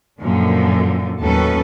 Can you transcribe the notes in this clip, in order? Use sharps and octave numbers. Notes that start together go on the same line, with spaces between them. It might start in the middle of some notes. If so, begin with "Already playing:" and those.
F#2 A#2 D3 F3
D#2 A2 F#3 C#4 A4 B4